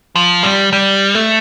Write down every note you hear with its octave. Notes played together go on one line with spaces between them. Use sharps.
F3
G3
G3
A3